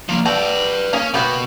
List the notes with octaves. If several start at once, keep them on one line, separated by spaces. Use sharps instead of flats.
F3 A#3
F#4 A4 B4 D5 G5
A#3 C#4 G#4
B2 A#3 B3 F#4 G4